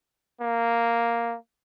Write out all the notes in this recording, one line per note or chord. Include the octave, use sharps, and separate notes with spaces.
A#3